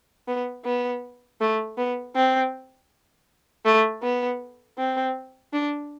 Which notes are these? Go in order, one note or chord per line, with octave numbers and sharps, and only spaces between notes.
B3
B3
A3
B3
C4
A3
B3
C4
D4